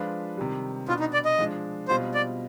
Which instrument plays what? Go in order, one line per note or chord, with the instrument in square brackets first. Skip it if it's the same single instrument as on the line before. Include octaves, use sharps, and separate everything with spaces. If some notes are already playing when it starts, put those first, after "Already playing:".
Already playing: [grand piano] F3 G#3 D4 F4 B4
C3 D#3 G3
[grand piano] B2 B3 D4 [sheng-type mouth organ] F4
[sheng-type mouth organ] D#4
D5
D#5
[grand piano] F3 G#3 D4
[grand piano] B2 G3 C4 F4 [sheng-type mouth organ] C5
[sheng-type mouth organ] D5